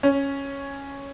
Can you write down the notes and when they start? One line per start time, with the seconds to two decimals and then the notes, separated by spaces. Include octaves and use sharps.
0.03 C#4